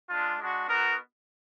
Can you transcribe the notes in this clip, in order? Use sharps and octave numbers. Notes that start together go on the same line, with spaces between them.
G#3 D4 F4
G#3 D4 F#4
B3 D#4 F#4 A#4